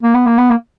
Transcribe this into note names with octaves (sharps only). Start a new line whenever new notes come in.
A#3
B3
A#3
B3
A#3